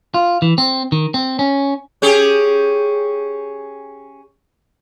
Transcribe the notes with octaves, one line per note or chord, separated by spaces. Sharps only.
F4
E3
C4
D#3
C4
C#4
C#4 G4 G#4